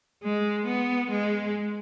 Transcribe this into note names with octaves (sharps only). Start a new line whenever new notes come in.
G#3
B3
G#3